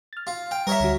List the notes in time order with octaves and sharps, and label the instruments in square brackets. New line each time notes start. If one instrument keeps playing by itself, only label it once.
[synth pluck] F6 A6
[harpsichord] F4
[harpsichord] G5 [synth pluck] F6
[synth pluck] G3 [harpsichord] A#4 C#5 E5
[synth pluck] D2 D3 F#4